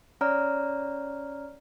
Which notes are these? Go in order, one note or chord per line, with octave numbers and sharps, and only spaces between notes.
C#4 C#5 D5 A#5 F6